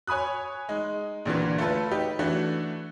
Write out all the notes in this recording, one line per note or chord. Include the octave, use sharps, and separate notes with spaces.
C#5 G#5 B5 D#6 F#6
G#3 D#4
A#1 A#2 D3 E3
A3 F4 A4 B4
D#4 G4 B4
E3 A3 D4 F#4